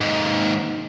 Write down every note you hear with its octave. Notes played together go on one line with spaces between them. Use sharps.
D#2 G#2